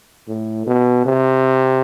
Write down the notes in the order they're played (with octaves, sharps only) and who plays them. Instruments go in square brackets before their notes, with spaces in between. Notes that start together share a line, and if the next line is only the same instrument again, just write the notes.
[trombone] A2
B2
C3